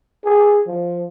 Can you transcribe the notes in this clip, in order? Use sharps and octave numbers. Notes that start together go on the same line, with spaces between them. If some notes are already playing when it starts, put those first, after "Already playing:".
G#4
F3